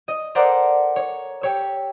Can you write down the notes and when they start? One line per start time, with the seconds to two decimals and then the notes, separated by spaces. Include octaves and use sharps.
0.08 D#5
0.35 A4 A#4 C5 D5 F#5
0.96 C#5
1.41 G4 C#5 E6